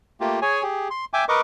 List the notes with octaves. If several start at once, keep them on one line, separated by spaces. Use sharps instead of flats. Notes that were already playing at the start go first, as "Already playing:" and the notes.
A3 A#3 F4 G4
G#4 C#5 G#5
G4 G#4
C6
E5 G5 G#5 D6
A#4 B4 D#5 C#6 D6